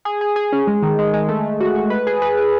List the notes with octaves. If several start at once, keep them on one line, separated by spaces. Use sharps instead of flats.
G#4
G#4
G#4
C#4
G#3
D#3
G#3
G#3
A3
A3
F#4
F#4
B4
G#4
B4
B4